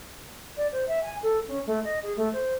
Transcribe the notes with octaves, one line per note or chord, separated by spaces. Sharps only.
D5
C5
E5
G#5
A4
C#4
A3
D#5
G#4
A3
C5